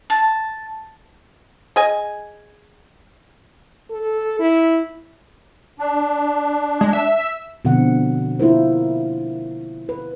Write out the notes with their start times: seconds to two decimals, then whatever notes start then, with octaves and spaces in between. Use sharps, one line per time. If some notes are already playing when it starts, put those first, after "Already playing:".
0.10 A5
1.76 G#4 D#5 G#5
3.90 A4
4.39 E4
5.79 D4
6.81 G#3
6.93 E5
7.65 B2 D3 F3 C4 F#5
8.40 A#3 E4 F4 A#4 C5
9.89 B4